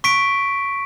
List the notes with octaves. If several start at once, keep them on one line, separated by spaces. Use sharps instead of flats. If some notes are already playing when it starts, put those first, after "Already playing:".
C#6 B6 D7